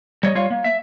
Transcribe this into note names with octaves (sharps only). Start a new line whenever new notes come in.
G3 C#5 D#5
G3 F4 C#5 F5
A#3
E5